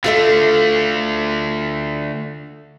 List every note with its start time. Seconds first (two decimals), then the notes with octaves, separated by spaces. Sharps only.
0.04 D3 A3 F4 A4 E5